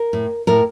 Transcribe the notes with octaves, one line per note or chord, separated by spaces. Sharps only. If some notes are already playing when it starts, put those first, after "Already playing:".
Already playing: A#4
A2
A2 A#4